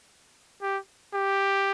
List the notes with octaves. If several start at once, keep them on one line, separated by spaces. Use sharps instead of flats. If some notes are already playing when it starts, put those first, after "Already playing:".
G4
G4